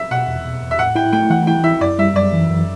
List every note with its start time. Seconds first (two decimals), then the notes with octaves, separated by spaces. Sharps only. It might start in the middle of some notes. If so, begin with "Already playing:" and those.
Already playing: E5
0.11 B2 F#5
0.27 E2
0.44 B2
0.62 E2
0.71 E5
0.79 A2 F#5
0.95 E4 G5
1.13 A3 G5
1.30 E3 F#5
1.47 E4 G5
1.64 E4 E5
1.81 F#2 D5
1.99 G3 E5
2.15 F#2 D5
2.33 E3
2.49 F#2